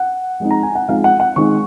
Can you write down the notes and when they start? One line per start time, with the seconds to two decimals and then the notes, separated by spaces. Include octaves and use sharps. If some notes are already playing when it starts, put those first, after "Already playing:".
Already playing: F#5
0.40 F3 G#3 C4 D#4
0.51 A#5
0.63 G#5
0.75 F#5
0.89 F3 G#3 C4 D#4 F5
1.04 F#5
1.20 F#5
1.36 D#3 G#3 C4 D#4 C#6